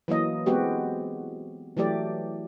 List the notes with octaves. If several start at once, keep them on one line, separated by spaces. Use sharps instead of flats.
E3 F#3 A#3 D#5
G#3 B3 C4 F#4 G4
E3 F#3 A3 G4 D5